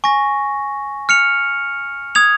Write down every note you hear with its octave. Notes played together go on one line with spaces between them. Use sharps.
G#5 C#6 A#6
F6 C#7 F7
D#6 G#6 F7